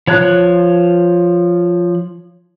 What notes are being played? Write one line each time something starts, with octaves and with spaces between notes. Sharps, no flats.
F3 C#5 A5 F#6